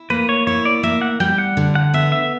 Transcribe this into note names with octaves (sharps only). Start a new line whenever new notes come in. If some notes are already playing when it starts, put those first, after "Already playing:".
Already playing: E4
A#3 B4
C#5
E4 C#5
D5
A#3 E5
F#5
G3 G5
F#5
D3
F#5
B3 E5
E5